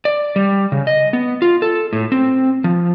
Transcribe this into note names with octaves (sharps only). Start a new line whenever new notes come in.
D5
G3
C#3
D#5
B3
F4
A4
A2
C4
F3